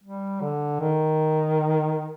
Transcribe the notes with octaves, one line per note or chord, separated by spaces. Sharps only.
G3
D3
D#3